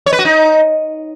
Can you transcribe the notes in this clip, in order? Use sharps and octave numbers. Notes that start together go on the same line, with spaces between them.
C#5
B4
F#4
D#4